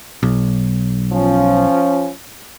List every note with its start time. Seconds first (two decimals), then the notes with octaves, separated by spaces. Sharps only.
0.23 B1
1.13 F3 C#4